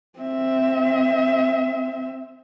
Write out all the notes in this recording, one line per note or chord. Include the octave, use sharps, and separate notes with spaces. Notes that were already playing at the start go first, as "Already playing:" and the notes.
C4 E5